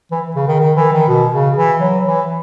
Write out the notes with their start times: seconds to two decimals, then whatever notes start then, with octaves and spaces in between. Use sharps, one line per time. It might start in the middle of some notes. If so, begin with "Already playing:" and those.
0.11 E3
0.36 C#3
0.48 D#3
0.60 D#3
0.76 E3
0.93 D#3
1.08 B2
1.33 C#3
1.56 E3
1.81 F#3
2.05 E3